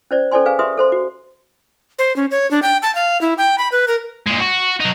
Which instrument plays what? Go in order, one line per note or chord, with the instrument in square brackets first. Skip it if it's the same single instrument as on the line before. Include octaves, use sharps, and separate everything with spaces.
[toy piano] C#4 C5 D5
C#4 A4 C5 D5 G#5 C6
G#4 B4 F5 G#5
G4 G#4 B4 E5 C6 D#6
A4 C5 C6
F#4
[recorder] C5
C#4
C#5
D4
G5
A5
F5
E4
G5
B5
B4
A#4
[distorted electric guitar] A#2 G#3
F#4
F#3 D#4